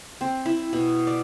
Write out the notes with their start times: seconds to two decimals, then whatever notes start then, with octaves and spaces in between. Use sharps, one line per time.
0.21 C4
0.46 E4
0.73 B2
1.07 D5